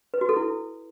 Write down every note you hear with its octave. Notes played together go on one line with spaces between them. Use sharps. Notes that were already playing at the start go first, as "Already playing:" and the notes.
B4
F#4
A4
E4